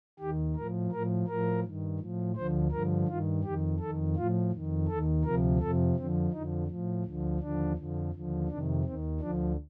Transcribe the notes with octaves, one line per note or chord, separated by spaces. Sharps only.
D#2 D#3 G4
A2 F3 A#4
A2 F3 A#4
A2 F3 A#4
G2 D#3
A2 F3
D2 D3 F3 C5
G2 D3 F3 A#4
G2 D#3 F4
F2 D#3 G4
F2 D#3 A4
A2 F3 F4
F2 D#3
D#2 D#3 A4
D2 C3 F3 A#4
F2 C3 F3 A4
F2 D3 F3 C4
F2 D3 F3 D#4
A2 F3
D2 D3 F3
D#2 D3 F3 D4
F2 D3 F3
D#2 D3 F3
F2 C3 D#3 D4
D#2 D#3 C4
D2 D3 F3 D4